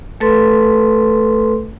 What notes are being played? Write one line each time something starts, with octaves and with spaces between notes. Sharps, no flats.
A3 A4 B4 C6